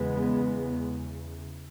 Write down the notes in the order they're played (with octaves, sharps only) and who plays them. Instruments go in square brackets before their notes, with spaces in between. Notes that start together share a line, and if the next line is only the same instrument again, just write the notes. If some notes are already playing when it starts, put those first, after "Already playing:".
Already playing: [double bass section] E2 C#3 G#3 B3